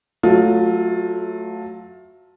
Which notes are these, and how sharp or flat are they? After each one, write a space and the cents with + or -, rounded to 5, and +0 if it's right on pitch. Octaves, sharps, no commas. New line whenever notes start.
F#3 +0 A3 +0 F4 +20